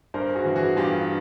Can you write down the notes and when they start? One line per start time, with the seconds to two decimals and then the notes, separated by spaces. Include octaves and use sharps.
0.14 G2 A#4 C5
0.35 F#4 G#4
0.45 E3
0.56 F#4 G#4
0.77 G2 F4 G4